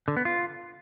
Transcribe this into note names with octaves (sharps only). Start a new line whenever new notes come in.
D3
B3
F4